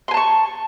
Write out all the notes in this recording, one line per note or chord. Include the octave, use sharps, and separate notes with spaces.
G#5 A5 C6 C#6